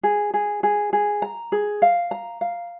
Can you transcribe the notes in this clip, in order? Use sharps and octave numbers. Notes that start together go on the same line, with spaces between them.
G#4
G#4
G#4
G#4
A#5
G#4
F5
A#5
F5